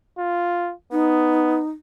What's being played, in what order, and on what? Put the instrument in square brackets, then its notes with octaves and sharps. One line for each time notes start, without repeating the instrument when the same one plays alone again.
[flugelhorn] F4
[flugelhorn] B3 [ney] D#4